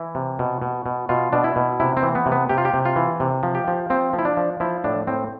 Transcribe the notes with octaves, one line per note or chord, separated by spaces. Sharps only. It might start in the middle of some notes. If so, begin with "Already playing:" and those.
Already playing: E3 E4
C3
B2
B2
B2
B2 F4
B2 D4
E4
B2
C3 E4
C4
E3
B3
C3
B3
C3 G4
F4
G4
C3
F4
E3
C3
F3
G4
F3
F3 C4
F3
E4
D4
F3
F3 E4
A2 D4
A2 C4